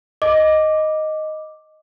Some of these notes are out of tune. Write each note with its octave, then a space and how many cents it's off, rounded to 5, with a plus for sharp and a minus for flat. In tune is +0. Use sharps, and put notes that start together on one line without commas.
D#5 +0 D6 +0